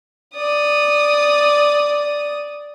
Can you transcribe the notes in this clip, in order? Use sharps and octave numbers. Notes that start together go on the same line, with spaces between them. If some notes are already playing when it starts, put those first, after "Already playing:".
D5 D#6